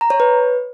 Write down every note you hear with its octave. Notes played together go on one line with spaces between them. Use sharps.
A#5
C#5
B4